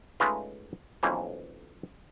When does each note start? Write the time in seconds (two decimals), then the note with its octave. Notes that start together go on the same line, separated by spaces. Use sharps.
0.20 G#3 A3 C#4 D#4 F4 B4
1.03 B1 F2 E3 A#3 C#4 C5